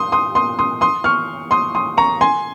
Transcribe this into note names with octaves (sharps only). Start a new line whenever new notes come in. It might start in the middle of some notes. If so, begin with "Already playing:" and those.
Already playing: C6 D#6
C6 D#6
C6 D#6
C6 D#6
C6 D#6
C#6 F6
C6 D#6
C6 D#6
A#5 C#6
G#5 C6